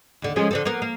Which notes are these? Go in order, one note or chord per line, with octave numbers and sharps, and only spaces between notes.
D#2 D3
F3 G#3 C#4
D3 C4 A4
A#3 B3 A#4
A#3